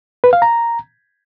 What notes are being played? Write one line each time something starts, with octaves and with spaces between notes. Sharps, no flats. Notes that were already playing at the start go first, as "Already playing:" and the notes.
B4
F5
A#5